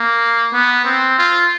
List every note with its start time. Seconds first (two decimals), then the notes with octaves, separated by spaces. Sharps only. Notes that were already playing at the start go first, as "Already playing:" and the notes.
Already playing: A#3
0.54 B3
0.85 C4
1.19 F4